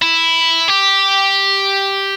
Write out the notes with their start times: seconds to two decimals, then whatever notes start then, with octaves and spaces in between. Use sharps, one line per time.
0.02 E4
0.68 G4